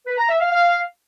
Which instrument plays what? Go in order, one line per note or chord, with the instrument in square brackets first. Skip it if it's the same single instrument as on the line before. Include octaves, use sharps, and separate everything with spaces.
[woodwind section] B4
A#5
E5
F5
F5